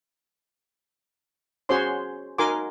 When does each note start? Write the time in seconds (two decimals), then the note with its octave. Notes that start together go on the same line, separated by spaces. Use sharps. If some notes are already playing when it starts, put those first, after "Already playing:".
1.69 C#4 F#4 G#4 C5 C#5 C6
2.38 D#4 F#4 A#4 G#5 C6 D6